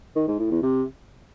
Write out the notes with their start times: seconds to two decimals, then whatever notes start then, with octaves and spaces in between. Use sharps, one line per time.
0.16 D#3
0.28 G#2
0.39 A2
0.51 E2
0.63 C3